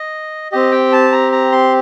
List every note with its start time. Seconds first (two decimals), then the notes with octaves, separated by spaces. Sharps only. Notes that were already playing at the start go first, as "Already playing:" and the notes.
Already playing: D#5
0.52 C4 G4 D#5
0.72 G5
0.92 A5
1.12 A#5
1.32 A#5
1.52 C6